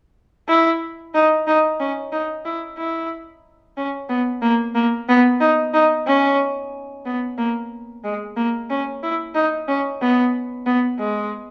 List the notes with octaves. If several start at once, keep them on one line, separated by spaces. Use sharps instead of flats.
E4
D#4
D#4
C#4
D#4
E4
E4
C#4
B3
A#3
A#3
B3
D#4
D#4
C#4
B3
A#3
G#3
A#3
C#4
E4
D#4
C#4
B3
B3
G#3